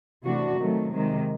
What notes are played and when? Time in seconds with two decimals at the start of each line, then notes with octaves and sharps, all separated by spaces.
0.25 C3 E3 A3 D4 F#4
0.58 C3 D#3 F#3 A3
0.91 C3 D#3 G#3